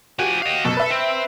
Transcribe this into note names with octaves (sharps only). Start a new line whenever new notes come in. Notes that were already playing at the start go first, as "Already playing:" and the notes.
F3 F#4 G4 G#5
D#5 F5
F#2 B2 A4
B4 E5
C4